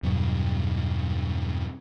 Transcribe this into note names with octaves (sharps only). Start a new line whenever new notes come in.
E2 G2 B2 F#3